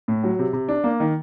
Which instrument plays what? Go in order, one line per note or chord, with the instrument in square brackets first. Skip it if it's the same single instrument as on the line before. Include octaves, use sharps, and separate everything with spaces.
[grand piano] A2
F#3
C3
C3
D4
A#3
D#3